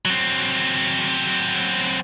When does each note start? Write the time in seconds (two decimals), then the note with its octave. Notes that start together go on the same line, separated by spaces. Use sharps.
0.05 F#3 C4